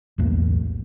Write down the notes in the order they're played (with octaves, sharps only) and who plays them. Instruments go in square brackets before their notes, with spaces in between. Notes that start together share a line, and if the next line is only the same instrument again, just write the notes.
[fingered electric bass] B1 E2 A2 A#3